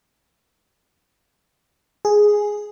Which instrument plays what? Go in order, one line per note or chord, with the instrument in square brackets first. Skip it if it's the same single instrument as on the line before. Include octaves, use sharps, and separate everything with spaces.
[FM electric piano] G#4